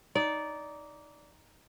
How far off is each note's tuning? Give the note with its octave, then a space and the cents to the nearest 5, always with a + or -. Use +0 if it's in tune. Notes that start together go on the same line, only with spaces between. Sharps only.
D#4 +0 D5 -15